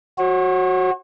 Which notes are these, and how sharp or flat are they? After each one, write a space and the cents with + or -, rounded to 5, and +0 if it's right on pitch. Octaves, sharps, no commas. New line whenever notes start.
F#4 +0 C#5 -45